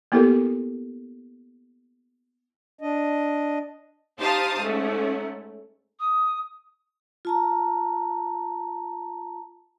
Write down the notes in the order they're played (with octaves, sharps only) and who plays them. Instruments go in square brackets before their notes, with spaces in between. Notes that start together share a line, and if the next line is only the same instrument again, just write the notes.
[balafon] A#3 B3 E4 G4 A4 A#4
[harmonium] D4 D#5
[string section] D#4 G4 C5 F5 A5 D#6
G#2 A3 C#4
[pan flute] D#6
[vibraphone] F4 A5 A#5